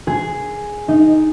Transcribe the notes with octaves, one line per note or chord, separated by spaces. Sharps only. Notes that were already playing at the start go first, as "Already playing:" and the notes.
G#4
D#4